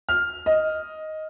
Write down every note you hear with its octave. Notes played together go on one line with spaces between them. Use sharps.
F6
D#5